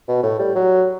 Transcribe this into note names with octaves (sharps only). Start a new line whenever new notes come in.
B2
A2
G3
F#3